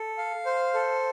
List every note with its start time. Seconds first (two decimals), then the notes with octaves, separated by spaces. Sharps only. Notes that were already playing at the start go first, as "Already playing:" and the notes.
Already playing: A4
0.18 F5
0.46 C5
0.74 A4